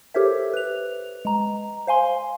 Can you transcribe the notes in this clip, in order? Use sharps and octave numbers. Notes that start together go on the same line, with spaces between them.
G4 A4 A#4 C5 C#5 E5
B4 F7
G#3 A#5
C5 F5 G#5 C6